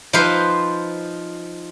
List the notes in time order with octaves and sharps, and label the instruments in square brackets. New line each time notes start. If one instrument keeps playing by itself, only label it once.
[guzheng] F3 D#4 B4 C5